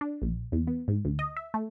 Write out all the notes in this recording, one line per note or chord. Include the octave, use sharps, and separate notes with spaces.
D4
A#1
E2
B3
G#2
D2
D#5
E5
A3